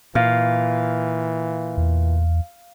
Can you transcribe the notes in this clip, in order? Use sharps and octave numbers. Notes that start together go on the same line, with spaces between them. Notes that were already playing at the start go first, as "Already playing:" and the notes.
A#2 E3 F5
E2